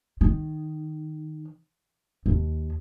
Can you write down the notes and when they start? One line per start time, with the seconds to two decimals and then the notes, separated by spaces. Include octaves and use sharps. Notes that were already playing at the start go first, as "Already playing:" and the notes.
0.21 D#3
2.26 D#2